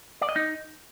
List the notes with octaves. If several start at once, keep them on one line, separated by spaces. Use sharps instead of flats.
D5
D#5
D#4